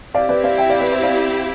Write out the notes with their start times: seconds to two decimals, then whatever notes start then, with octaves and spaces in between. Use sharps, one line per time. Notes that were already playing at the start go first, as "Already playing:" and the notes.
0.14 C4 E4 G4 D5 F5
0.29 B4 D5
0.44 D5 F5
0.58 E5 G5
0.70 D5 F5
0.80 B4 D5
0.92 C5 E5
1.03 D5 F5